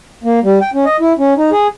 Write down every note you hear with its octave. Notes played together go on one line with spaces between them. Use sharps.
A#3
G3
G5
C#4
D#5
E4
C#4
D#4
G#4